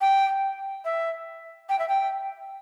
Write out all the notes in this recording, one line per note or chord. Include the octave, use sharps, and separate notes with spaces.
G5
E5
G5
E5
G5